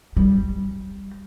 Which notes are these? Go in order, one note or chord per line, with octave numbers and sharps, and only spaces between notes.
G3